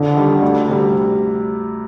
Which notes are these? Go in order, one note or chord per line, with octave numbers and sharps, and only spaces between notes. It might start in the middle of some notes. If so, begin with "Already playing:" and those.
Already playing: F2 D3
D#3 G3
D2
C3 G3